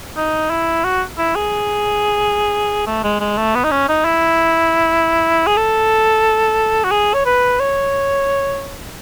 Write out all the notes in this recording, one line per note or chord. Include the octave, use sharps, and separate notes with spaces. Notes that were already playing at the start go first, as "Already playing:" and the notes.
D#4
E4
F#4
E4
G#4
A3
G#3
G#3
A3
B3
D#4
C#4
D#4
E4
G#4
A4
F#4
G#4
C#5
B4
C#5